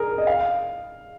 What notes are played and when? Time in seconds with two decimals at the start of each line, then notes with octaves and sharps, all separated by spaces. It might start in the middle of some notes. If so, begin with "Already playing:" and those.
Already playing: G#4 A#4
0.18 D#5
0.27 F5